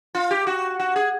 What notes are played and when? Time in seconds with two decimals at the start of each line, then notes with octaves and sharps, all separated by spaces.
0.15 F4
0.31 G4
0.47 F#4
0.80 F#4
0.96 G#4